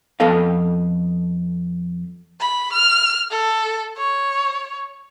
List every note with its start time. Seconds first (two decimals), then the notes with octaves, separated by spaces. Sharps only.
0.20 F2 B3 A4 D#5 F5
2.40 B5
2.73 F6
3.31 A4
3.97 C#5